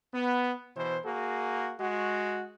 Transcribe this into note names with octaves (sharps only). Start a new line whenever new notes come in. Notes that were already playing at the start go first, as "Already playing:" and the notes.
B3
B2 E3 C5
A#3 F#4 G#4
G#3 F#4